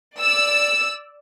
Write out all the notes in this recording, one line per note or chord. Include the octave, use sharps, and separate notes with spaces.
D5 E6